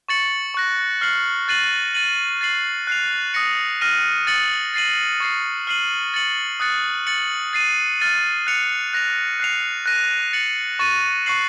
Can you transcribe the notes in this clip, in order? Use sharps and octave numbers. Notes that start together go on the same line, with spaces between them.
C#6 A6 C#7 F#7
C#6 F#6 A#6
F6 C7 F#7
F#6 A6 C7 D#7 F#7
A6 D#7 F#7
A6 C7 F#7
F#6 C7 F7
D#6 A#6 C#7
F6 A#6 D#7
D#6 A6 C#7 F#7
A6 C7 D#7 F#7
C#6 A6 C7
F6 C7 D#7 F#7
A6 C#7 F#7
D#6 F#6 A6 C#7
A6 C#7 F#7
A6 C7 D#7
F6 A6 D#7
F#6 A6 C#7 F7
F#6 A#6 F7
F#6 C7 F7
F#6 A#6 D#7
A6 C#7 F#7
C#6 A6 D#7
C#6 F#6 C7 F#7